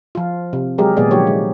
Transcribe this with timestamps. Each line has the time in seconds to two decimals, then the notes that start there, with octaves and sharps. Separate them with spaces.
0.15 F3 F4
0.53 C3
0.78 F#3 G#3 G4 G#4 A#4
0.97 A#2 D#3 G#3 B3 G#4 D5
1.11 D3 F3 F#3 A#3 G4 C#5
1.27 G#3